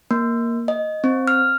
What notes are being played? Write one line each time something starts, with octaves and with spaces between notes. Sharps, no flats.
A#3
D#5
C4
F6